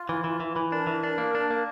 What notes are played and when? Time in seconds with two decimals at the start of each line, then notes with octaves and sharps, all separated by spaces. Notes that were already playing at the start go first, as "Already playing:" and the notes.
Already playing: F4
0.09 E3
0.24 E3
0.40 E3
0.56 E3
0.72 D4 A#4
0.87 E3
1.04 D4
1.18 A#3
1.35 D4
1.50 A#3